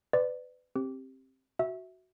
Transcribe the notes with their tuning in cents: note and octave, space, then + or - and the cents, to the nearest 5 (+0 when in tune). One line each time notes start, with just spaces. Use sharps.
B4 +30 D5 +15
C4 +20 G4 +5
F#4 +0 E5 -10